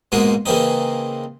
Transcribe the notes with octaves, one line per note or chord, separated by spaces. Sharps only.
G#2 B2 G#3 A#3 F4
C#3 E3 A#3 C4 D#4